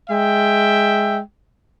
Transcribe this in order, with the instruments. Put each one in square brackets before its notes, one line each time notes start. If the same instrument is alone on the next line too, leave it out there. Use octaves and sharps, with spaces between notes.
[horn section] G#3 E5 G5